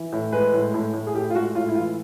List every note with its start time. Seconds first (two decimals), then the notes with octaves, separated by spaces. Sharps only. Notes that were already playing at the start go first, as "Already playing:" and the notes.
Already playing: E3
0.12 A2
0.32 G#3 B4
0.53 A2
0.74 A2
0.93 A2
1.07 G#4
1.14 A2 G4
1.30 F4
1.35 G#3 F#4
1.55 A2 F4
1.69 E4
1.75 E3 F4